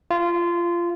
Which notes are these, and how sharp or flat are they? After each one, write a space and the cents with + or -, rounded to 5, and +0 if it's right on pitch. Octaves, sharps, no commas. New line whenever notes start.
F4 -20